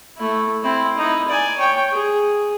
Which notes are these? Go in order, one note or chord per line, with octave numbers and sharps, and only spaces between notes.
A3 E4
C4 E4
D#4 E4
D5 G#5
C#5 G5
G#4